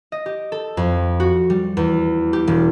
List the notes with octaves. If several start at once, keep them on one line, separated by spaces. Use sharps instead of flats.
D#5
G4
A4
F2
F#4
G3
E2
G4
E1